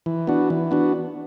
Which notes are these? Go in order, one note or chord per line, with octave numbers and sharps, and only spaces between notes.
E3
B3 D4 F#4
E3
B3 D4 F#4